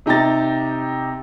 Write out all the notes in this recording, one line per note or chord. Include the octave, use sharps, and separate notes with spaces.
C3 D#4 G4 A#5 A6